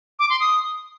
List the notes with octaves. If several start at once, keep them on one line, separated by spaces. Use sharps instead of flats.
D6
C6
D#6